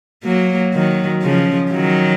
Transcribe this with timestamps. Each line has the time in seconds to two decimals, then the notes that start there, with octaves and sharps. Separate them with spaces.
0.24 F#3 A#3
0.74 D#3 F#3
1.22 C#3 F3
1.71 D#3 F#3